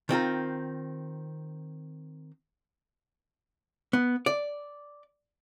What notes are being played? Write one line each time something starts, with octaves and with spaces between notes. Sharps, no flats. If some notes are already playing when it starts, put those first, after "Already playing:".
D#3 C4 F4 A#4
B3
D5